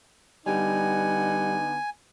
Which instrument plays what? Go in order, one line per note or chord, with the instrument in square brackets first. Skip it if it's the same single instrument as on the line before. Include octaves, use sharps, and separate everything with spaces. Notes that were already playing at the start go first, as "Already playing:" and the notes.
[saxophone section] D3 B3 D#4 [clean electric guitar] G3 [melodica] G#5